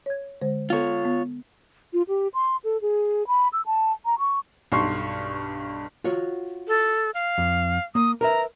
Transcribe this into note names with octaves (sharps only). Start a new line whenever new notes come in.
C#5 G#6
D3 G#3 C5
B3 F4 A4 C#5
B3
F4
G4
C6
A4
G#4
B5
E6
A5
A#5
C#6
B1 G2 C6 C#6 C7
F4 F#4 C#5
A4
F5
F2
A#3 D#6
A#4 B4 E5 A#5